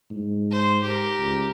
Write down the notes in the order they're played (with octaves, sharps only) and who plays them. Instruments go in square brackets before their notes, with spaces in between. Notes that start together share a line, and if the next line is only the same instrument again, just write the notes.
[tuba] G#2
[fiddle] C5
G4 A#4
[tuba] C#2